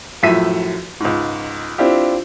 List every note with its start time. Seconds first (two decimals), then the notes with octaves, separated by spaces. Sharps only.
0.23 F#2 A2 F3 E5 B6 D#7
1.00 C#2 G#2
1.78 C4 D4 E4 F4 G4